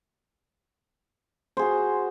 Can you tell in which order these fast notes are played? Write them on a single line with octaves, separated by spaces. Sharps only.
C5 G#4 F#4